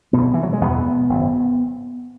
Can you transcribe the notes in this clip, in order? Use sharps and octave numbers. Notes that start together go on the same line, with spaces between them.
B1 B2 B3
E3
F#3
G#3
F#1 E2 B2 B3
G#1 F#2 C#3